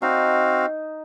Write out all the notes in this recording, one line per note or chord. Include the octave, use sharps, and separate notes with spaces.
C4 D#4 F#4 F5